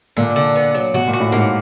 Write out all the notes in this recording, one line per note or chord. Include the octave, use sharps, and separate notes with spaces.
A#2 D3
D3
B3
F#3
B2 F#4
A#2
F#4
A2
G#2 A#3